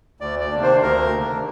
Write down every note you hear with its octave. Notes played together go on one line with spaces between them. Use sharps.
D2 D5
D5
C3 D#3 A#3 D4
C5
D2 A#4
C3 D#3 A#3 D4